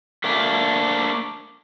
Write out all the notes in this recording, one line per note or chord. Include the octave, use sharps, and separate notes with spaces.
A3 A#3 D4